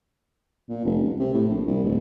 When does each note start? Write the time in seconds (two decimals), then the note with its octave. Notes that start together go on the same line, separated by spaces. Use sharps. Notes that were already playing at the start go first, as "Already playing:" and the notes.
0.69 A#2
0.85 F1
1.03 C#2
1.19 C3
1.34 A2
1.49 A#1
1.66 C2
1.84 D1